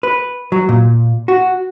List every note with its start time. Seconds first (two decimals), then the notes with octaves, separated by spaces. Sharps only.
0.03 B4
0.52 F#3
0.69 A#2
1.28 F#4